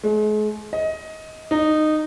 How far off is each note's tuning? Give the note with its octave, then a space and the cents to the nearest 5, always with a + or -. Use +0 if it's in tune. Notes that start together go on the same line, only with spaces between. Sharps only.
G#3 +40
D#5 +20
D#4 -15